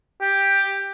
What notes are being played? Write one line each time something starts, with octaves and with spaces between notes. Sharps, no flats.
G4